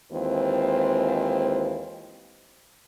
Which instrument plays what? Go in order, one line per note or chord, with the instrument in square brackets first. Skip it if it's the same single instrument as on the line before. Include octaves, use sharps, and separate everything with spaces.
[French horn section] D#2 E3 G#3 C4 F4 C5